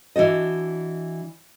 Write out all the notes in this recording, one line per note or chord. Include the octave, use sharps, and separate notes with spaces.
E3 D4 F#4 D#5